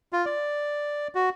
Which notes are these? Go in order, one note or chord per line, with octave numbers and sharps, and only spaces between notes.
F4
D5
F#4